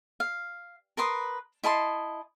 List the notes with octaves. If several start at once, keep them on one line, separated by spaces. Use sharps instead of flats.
F5
A#4 B4 C6 D#6
E4 D#5 A5 C6